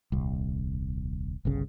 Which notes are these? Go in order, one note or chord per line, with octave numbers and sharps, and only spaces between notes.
D#1 C2
G1 C2 C#3